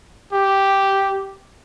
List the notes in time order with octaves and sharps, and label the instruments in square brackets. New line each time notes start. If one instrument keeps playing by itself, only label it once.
[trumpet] G4